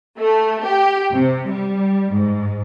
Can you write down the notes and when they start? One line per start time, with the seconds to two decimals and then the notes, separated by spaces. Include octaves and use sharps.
0.18 A3
0.63 G4
1.14 C3
1.48 G3
2.12 G#2